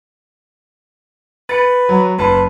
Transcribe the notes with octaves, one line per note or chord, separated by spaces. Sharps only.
B4 A6 C#7
F#3
F#1 B4 A5 C6